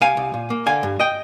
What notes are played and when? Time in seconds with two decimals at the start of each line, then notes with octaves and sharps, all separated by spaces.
0.01 C2 F5 G#5
0.17 C2
0.34 A#2
0.50 A#3
0.66 D3 F5 G#5
0.83 G2
1.00 D#5 G5